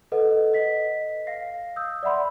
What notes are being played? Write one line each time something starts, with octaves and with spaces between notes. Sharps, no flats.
A4 B4 D#5 F#5
D#5 B6
F5 A#6 C7
D#6 E6 G6
D5 E5 F#5 B5 C6